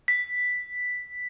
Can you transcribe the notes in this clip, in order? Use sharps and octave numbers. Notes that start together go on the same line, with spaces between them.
B6